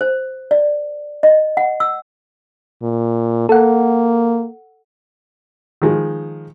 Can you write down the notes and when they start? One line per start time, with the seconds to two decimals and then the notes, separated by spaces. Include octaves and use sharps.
0.01 C5
0.51 D5
1.23 D#5
1.57 F#5
1.80 E6
2.82 A#2
3.49 A#3 A4 F#5
5.82 D#3 F3 G#3